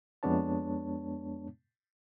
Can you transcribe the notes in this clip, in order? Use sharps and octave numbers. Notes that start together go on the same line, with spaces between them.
F2 G#3 B3 D4 C#5 A5